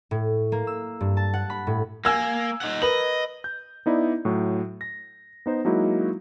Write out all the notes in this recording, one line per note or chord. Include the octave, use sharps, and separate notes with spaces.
A2
A#3
E6
G2
A5
F#5
B5
A2
A#3 G#5 E6 G#6
D#4 F#5
A#4 B4 D#5 F#7
G6
B3 D#4 E4 D5
A2 F#3
A#6
B3 D#4 C5
F#3 G#3 A#3 D#4 E4 F#4